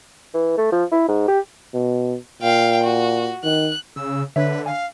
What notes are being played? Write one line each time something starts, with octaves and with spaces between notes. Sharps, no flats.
E3
A3
F3
E4
G#2
G4
B2
A#2 F5 G5
F#4
D#3 F#6
C#3 E6
D3 D4 B4 C#5 E5
F5 G#5